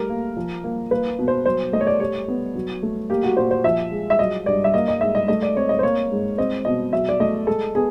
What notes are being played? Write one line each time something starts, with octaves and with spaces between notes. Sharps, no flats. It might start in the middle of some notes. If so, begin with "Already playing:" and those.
Already playing: G3 A3 A#4
A#3
F3
A#3
A#3 B4
B2
C5
F#3 C5
A3 D#5
C#5
D5
G3 C#5
B3
F#3
A3
A#3 G4
F#4
A#2 C5
C5
F3 E5
G#3
E5
F#3 D#5
G2 D5
E5
A#3 D#5
D#5
G#2 E5
D#5
A3 D#5
D5
C4 C#5
D#5
C5
A#3 C#5
G#2
C4 D#5
B2 D#5
F#3 E5
D5
A3 D#5
G#3 A4
B3 G#4